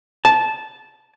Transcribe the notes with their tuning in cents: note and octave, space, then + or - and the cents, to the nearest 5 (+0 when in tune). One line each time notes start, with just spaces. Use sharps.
A5 -15